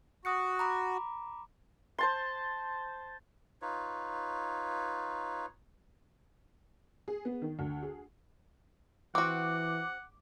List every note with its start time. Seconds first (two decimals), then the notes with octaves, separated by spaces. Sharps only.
0.25 F#4 D#6 F#6 C#7
0.59 A#5 B5 D6
1.98 C5 A5 C6
3.62 D#4 F4 B4 C#5
7.08 G#4
7.25 B3
7.42 D#3
7.59 D2
7.82 G#4
9.15 E3 C4 F#4 F#5 D6